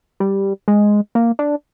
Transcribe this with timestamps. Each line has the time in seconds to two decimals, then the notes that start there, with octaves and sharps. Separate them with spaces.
0.20 G3
0.68 G#3
1.15 A#3
1.39 D4